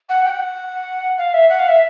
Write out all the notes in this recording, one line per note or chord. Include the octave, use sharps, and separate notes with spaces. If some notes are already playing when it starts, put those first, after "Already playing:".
F#5
G5
F#5
F5
E5
F#5
F5
E5